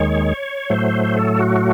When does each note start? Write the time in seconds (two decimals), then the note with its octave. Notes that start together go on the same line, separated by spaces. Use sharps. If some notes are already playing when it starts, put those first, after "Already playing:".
Already playing: D#2 D#3 G#3 C#5
0.70 A2 F#3 A3 C5
1.16 A4
1.39 F#4